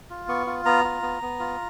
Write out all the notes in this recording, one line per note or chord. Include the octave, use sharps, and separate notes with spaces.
F4
B3 C#6
F4
B3 A#5
F4
B3
B3
F4